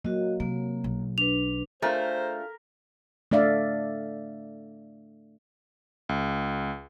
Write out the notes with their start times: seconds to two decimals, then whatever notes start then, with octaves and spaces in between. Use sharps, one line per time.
0.05 F#3 A#3 F#4 D#5
0.40 C3 F#3 A#3
0.84 B1
1.18 D4 B4 F7
1.82 A3 D4 F4 G#4 A#4 C5
3.32 A3 D4 D5 E5 F5
6.09 C#2